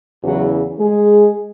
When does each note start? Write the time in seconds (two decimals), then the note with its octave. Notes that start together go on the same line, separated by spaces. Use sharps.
0.23 E2 C#3 E3 F#3 F#4
0.79 G#3 G#4